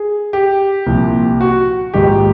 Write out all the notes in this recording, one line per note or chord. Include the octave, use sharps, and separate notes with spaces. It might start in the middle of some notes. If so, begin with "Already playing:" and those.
Already playing: G#4
G4
C2 A#2 F3
F#4
A#1 G#2 D#3 G4